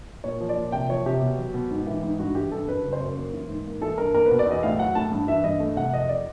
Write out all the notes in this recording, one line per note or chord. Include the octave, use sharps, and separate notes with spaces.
A#2 C#5
F3
D5
A#2
C3 G5
F3 C#5
C3 G4
B2
F#3
B2
G#2
E3
G#2
G2 F#4
E3 G4
G2 A4
F#2 B4
C#3
C5
F#2
A#3
E3
G#2
A#3
E3 A4
G2 A#4
A#3 A#4
B4
B2
D5
E2 D#5
A2 F5
F#3 F#5
A2 A5
G2
E3 E5
G2 D#5
A3
C3 F#5
F2 D#5
D5